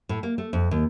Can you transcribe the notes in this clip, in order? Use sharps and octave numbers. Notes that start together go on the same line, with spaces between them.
A2
A#3
A3
F2
D#2